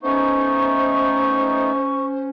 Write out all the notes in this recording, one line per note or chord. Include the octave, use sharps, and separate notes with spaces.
A3 B3 C#4 D#4 C5 C#6